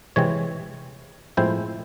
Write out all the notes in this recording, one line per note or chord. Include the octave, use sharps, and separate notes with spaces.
C3 E3 G#3 C4 C#5
A2 F3 G#3 C4 E4 C5